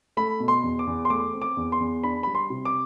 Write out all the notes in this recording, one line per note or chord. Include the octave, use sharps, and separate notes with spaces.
A3 B5
B2
C6
E2
D6
E2
C6
A3 D6
C4
D6
E2
C6
E2
D4 B5
G3 B5
C6
C3
D6